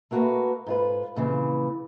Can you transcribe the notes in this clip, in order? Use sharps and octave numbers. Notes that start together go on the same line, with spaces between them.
A3 A#3 F#4 G#4 A#4 B4
G#2 F4 B4
F2 A#2 C#3 E3